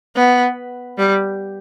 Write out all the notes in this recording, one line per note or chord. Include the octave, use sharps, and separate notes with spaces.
B3
G3